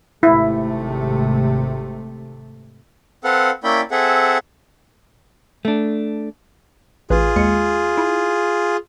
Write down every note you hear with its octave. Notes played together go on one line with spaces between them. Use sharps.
G#1 C3 A3 E4
C4 A4 B4 F5 F#5
A#3 C#4 E4 D5 G5 B5
C4 G#4 A4 E5 F#5
A3 D4
A1 F4 G#4 B4
D#2 G#3 C#7
E4